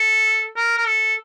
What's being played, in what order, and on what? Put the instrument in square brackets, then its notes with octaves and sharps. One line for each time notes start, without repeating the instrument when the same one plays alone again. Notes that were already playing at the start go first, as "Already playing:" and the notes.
Already playing: [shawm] A4
A#4
A#4
A4